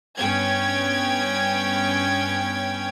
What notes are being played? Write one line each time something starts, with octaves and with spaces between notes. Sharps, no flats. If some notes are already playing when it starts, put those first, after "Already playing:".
G2 B3 C#4 G5 G#6